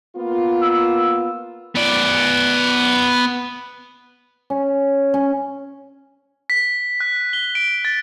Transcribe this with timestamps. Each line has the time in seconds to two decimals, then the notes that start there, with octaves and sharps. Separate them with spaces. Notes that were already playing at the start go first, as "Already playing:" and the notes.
0.16 A#3 B3 F4
0.62 E6
1.75 B3 D5
4.50 C#4
5.14 C#4
6.50 B6
7.00 F#6
7.33 G7
7.55 D7
7.85 A6